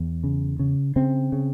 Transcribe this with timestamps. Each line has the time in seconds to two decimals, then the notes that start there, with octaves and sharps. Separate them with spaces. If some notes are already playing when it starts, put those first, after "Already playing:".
Already playing: E2
0.24 C#3
0.59 C#3
0.96 C#3 C4
1.32 C#3